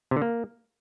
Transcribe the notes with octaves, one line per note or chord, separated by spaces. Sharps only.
C3
D3
A#3